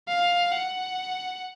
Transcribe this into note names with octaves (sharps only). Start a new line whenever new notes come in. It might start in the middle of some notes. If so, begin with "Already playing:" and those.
F5
F#5